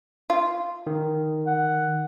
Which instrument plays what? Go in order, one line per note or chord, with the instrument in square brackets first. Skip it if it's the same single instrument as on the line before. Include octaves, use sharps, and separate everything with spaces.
[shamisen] F4
[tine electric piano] D#3
[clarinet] F#5